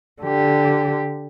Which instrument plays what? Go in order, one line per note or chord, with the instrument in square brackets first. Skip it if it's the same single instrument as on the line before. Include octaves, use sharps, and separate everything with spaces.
[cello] D3 G4